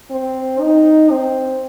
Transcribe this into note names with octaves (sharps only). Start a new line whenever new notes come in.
C4
D#4
C4